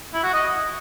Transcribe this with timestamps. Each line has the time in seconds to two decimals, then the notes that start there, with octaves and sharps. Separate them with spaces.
0.14 E4
0.23 F#4
0.33 D#5